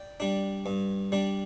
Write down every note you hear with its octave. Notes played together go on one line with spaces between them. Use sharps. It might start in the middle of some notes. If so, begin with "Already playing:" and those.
Already playing: D5 G5
G3 D4
G2
G3 D4